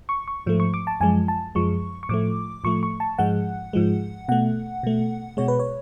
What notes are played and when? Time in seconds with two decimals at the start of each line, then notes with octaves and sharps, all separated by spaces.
0.09 C#6
0.28 C#6
0.46 G#2 F3 A3
0.60 C#6
0.74 D6
0.87 A5
1.00 F#2 F3 G#3 G#5
1.28 A5
1.55 F#2 F3 G#3 C#6
2.03 C#6
2.09 A2 F3 A3 D6
2.64 A2 F3 A3 C#6
2.83 C#6
3.00 A5
3.18 G#2 F3 G#3 F#5
3.73 G#2 F3 G#3
4.28 B2 A3 F#5
4.83 B2 A3
5.37 B2 G#3 C#5
5.48 B4
5.59 C#5